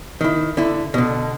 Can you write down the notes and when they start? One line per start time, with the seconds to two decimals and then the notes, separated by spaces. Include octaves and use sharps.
0.21 D#3 E4
0.57 D3 E4
0.94 B2 D3